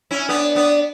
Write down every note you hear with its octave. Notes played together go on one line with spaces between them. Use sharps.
C#4 E4
B3 D4
B3 D4